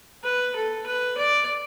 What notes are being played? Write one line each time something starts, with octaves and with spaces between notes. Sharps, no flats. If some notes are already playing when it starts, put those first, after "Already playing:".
B4
A4
B4
D5